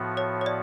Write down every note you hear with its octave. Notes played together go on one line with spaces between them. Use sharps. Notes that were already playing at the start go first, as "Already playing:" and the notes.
Already playing: A2 F3 B3 F#4
C#5
C#5
D5